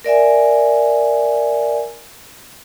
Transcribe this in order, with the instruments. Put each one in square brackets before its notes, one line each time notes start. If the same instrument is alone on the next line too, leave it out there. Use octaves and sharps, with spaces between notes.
[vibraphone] A#4 D5 E5 G#5